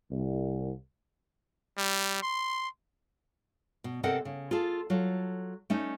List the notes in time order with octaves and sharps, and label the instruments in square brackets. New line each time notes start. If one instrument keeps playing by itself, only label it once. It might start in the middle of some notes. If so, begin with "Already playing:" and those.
[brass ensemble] C2
[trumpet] G3
C6
[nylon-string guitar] B2
C3 C4 A4 A#4 D#5 F#5
C#3
F4 G#4 A4
F#3 F4 A4
A3 C#4 D#4